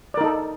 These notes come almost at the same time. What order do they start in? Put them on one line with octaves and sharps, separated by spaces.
D5 A#4 D#4 A4